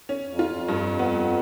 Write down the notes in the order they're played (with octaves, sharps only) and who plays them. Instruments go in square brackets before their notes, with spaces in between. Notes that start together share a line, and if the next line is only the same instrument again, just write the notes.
[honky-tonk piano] C#4
[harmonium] F2
[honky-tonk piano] F4
[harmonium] F2
[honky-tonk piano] G2
B3